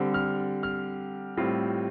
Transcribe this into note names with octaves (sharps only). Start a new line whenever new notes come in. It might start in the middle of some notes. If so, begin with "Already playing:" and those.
Already playing: D3 G3 C4
F6
F6
A2 G3 C4 F4